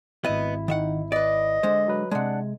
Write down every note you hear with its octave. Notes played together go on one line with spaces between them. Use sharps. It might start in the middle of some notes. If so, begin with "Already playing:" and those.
G#1 B3 E4 D#5
D#3 D#4 E5 F#5
B4 D5 D#5
D3 G#3 C5
F#3 B4
C3 G#3 D4 F#5